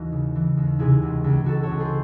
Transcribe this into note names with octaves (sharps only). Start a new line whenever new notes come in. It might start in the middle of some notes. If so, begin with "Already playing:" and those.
Already playing: D#2 E3 D#4 F#4
C#3
E3
D#2
C3 E4 G#4
C#2
C#2
C#2 F#4 A4
A4 C#5
C#2
G#4 C5